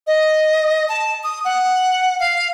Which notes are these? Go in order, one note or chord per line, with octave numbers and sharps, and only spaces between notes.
D#5
A5
D#6
F#5
F5